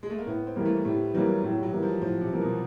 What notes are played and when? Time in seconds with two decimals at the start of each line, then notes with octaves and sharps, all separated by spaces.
0.03 G#3
0.10 A3
0.18 A#3
0.26 A2 B3
0.46 C4
0.56 E3 G3 A#3
0.65 A3
0.85 A2 G3
1.14 E3 F#3 G3 A#3
1.43 A2 F#3
1.57 G3
1.63 F#3
1.72 E3 G3 A#3
1.83 F3
2.01 A2 F3
2.21 C3
2.31 E3 G3 A#3
2.41 B2